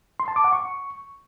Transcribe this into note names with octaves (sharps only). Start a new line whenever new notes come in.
C6
A5
D6
F#5
C#6